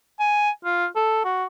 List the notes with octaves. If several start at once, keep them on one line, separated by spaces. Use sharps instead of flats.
G#5
F4
A4
F#4